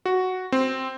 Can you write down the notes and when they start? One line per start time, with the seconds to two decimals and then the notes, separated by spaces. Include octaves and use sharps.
0.06 F#4
0.52 C4